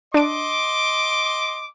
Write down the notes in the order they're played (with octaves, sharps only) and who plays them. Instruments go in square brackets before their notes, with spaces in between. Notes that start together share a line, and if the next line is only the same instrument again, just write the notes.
[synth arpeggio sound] D4 D7 [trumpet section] D#5 C6 D6